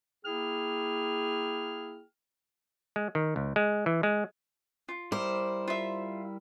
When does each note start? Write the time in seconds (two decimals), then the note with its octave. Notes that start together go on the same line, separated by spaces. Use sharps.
0.24 A#3 E4 G#4 G5 F6
2.96 G#3
3.15 D#3
3.36 C#2
3.56 G#3
3.86 E3
4.03 G#3
4.88 F4
5.12 G3 E4 A#4 C5 D6
5.68 F4 E5